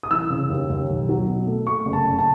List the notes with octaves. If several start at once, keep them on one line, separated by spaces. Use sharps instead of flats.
D#6
E3 E6
C#3
D#2
D#2
B1
F#3
B2
A3
A3 C#6
F#1
A5
F#1
A5